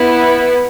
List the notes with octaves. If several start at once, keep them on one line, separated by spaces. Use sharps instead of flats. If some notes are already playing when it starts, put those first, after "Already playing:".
Already playing: B3 E4 B4